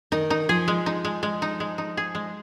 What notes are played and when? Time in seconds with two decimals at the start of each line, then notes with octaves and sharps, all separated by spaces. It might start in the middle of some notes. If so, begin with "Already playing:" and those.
0.12 D#3 D#4
0.30 D#4
0.49 F3 G#4
0.68 G#3
0.86 D#4
1.05 G#3
1.23 G#3
1.42 D#4
1.60 G#3
1.78 D#4
1.97 G#4
2.15 G#3